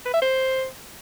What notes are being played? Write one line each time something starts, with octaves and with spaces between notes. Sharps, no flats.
B4
E5
C5